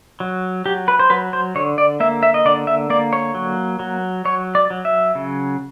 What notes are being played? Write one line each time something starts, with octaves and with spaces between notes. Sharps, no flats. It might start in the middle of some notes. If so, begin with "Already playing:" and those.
F#3
F#3 G4
B4
C5
F#3 B4
C5
D3 C#5
D5
A#3 E5
E5
D#5
D3 D5
E5
A#3 D5
C#5
F#3
F#3
F#3 C#5
D5
F#3
E5
C#3